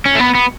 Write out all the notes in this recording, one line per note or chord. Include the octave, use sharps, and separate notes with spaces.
C#4
A3
B3
B3